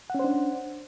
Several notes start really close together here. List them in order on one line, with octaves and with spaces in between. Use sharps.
F#5 C#4 C5 D4